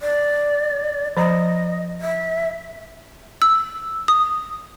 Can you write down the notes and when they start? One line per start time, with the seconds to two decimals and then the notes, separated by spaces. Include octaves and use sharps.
0.01 D5
1.17 F3 D5 D#5 A#5
2.01 E5
3.42 E6
4.08 D#6